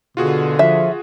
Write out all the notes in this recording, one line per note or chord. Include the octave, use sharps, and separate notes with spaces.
B2 D3 F4 F#4 G#4
F3 E5